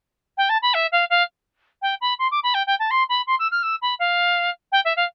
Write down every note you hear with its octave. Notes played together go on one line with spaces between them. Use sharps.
G5
A5
B5
E5
F5
F5
G5
B5
C6
D6
B5
G5
G5
A5
C6
B5
C6
E6
F6
E6
B5
F5
G5
E5
F5